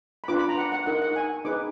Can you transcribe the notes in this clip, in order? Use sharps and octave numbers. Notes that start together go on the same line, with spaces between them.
B5
D4 F4 B4 D6
B5
A#5
F#5
F#5
D#4 A#4 F#5
F#5
G#5
D#4 G#4 B4 D6